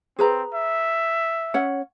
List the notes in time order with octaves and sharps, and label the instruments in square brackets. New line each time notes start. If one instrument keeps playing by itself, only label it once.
[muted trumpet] C4 [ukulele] G#4 B4 A#5
[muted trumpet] E5
[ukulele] C#4 C#5 F#5